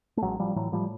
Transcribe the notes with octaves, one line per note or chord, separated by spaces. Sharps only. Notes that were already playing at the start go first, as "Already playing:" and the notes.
A3
A1 F#3 G#3
A1 F3 G3
A2 E3 F#3
A2 F3 G3